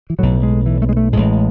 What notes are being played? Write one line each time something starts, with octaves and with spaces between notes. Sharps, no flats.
E3
B1 A2 F#3
G#3
E3
A3
G#3
A3
A1 A2 G#3